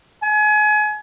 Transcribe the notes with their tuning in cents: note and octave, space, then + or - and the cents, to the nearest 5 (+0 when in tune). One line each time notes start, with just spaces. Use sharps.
G#5 +30